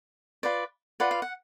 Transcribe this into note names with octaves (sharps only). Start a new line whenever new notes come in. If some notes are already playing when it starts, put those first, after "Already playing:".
F4 B4 D5
F4 B4 D5 F#5
F5
F#5